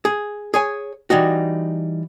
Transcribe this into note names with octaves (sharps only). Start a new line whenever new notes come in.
G#4
G#4 C#5 G#5
E3 G3 D#4 F#4